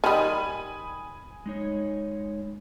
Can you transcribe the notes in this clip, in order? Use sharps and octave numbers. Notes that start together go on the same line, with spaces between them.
D#3 G3 G#5 B5 D#6
G#3 D#4 C#5